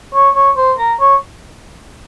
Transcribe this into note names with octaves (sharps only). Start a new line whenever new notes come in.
C#5
C#5
C5
A#4
C#5